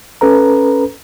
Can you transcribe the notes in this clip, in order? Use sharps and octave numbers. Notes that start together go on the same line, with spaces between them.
C#4 A4 B4 A#5